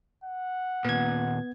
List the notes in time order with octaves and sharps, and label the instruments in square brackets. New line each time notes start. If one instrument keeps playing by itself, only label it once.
[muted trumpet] F#5
[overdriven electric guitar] D#2 A#2 [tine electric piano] B3 G#6